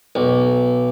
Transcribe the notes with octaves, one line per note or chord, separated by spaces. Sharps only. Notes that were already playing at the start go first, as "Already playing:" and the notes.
B1